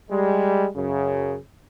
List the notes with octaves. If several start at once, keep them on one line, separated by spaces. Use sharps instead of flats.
G3 G#3
F#2 C#3